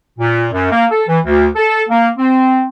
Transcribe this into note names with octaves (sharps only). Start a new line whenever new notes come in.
A#2
F#2
A#3
A4
E3
D2
A4
A#3
C4